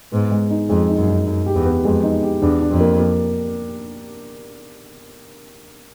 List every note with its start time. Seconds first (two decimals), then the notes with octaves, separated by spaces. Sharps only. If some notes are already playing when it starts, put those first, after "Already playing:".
0.12 G#2 B3
0.32 G#3
0.50 D#4
0.69 F2 G#3
0.89 D#4
0.98 F#2
1.08 D#4
1.27 F#2 D#4
1.46 G4
1.56 E2
1.66 B3
1.84 F2 G#3
2.04 D#4
2.23 G4
2.42 E2 D4
2.61 D4
2.71 F2
2.80 A#3
3.00 A#3